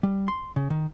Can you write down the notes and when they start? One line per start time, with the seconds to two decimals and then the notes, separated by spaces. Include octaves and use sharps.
0.03 G3
0.28 C6
0.56 C#3
0.70 D#3